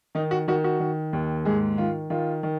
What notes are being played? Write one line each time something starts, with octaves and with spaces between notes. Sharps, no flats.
D#3 D#4
F#4
D#3 F#4
F#4
D#3
D#2
G#2 G#4
D#3 F4
D#3 F4
D#3